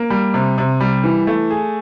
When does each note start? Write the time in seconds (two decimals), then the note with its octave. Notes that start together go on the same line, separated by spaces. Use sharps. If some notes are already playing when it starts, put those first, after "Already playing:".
Already playing: A#3
0.10 G3
0.34 C3
0.58 C3
0.80 G3
1.04 E3
1.27 A3
1.51 G#4